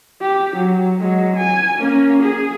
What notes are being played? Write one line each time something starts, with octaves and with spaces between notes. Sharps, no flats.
G4
F#3
F#3 G#3
G#5
A#3 C#4
G#4